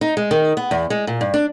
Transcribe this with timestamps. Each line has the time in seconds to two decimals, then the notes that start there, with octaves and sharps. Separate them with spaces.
0.01 D#4
0.17 G#3
0.31 D#3
0.57 B3
0.71 E2
0.90 G#3
1.07 A#2
1.21 G2
1.34 D4